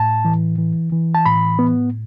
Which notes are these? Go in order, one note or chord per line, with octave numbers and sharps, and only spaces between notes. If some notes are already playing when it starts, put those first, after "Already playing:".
Already playing: A2 A5
E3
E3
E3
A5
A2 B5
B3